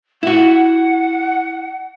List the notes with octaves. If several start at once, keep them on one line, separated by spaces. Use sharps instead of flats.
E4 F#4 F#5